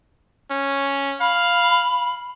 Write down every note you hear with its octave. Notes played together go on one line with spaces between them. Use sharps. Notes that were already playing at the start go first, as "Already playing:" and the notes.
C#4
F5 B5